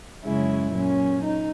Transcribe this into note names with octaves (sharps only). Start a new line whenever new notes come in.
F#2 C#3 G#3 C#4 E4
A#2 F#3 C#4
D#4